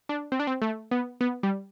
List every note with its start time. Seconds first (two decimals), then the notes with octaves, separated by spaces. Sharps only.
0.09 D4
0.32 C4
0.40 D4
0.47 C4
0.62 A3
0.91 B3
1.21 B3
1.43 G3